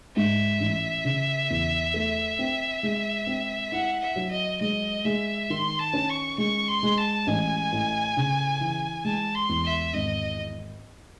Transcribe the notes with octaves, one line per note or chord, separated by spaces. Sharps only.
G#2 E5
A1
C#3
E2
A3
C4
G#3
C4
E4 F#5
E5
F#3
D#5
G#3 D#5
G#3 E5
D#3 C6
A5
C#4
C#6
G#3 C#6
C6
G#3
A5
A1 G#5
A2
C#3
E3
G#3 A5
C6
E2
E5
G#1 D#5